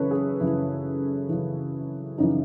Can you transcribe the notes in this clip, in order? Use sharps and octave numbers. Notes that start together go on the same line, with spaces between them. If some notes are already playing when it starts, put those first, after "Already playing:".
Already playing: F#2 C#3 E3 A4 B4 C#5
G#4
F#2 C#3 E3 E4
F#2 C#3 E3
F#2 C#3 E3 D#4